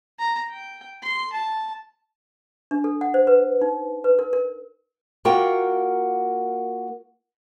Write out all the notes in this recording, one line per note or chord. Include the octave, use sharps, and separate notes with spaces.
A#5
G5
C6
A5
D4
A4
F#5
C5
B4
D#4
B4
A#4
A#4
A#3 F4 F#4 A#4 F#5 G5